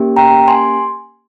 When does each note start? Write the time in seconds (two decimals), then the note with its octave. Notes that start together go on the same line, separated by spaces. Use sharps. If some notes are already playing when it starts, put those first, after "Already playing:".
Already playing: A#3 C#4 G4
0.16 G5 A#5
0.48 G#5 C6